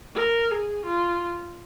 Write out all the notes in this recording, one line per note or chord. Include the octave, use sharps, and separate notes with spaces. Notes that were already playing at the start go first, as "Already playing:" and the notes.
A#4
G#4
F4